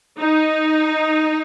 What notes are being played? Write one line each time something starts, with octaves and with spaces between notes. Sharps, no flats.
D#4